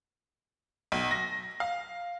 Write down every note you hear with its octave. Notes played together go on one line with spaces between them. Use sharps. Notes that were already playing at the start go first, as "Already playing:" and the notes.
B1
A#6
F5